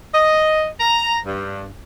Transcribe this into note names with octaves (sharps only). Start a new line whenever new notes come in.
D#5
A#5
G2